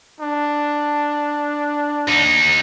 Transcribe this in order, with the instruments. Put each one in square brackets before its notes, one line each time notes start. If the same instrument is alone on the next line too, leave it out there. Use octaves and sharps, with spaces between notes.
[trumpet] D4
[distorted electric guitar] D#2 D#4